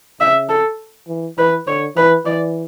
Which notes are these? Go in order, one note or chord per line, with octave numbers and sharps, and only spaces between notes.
C#3 E5
A4
E3
E3 B4
D3 C#5
E3 B4
E3 D5